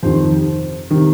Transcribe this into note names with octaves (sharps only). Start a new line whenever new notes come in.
F2 C3 D#3 C5
C3 D#3